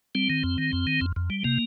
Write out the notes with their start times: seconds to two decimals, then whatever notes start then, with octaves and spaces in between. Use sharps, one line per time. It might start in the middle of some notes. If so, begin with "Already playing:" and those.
0.15 G3 C4
0.30 D#3
0.44 F2
0.58 D#3
0.73 F2
0.87 D#3
1.01 F2
1.16 F2
1.30 G3
1.44 C3 A#3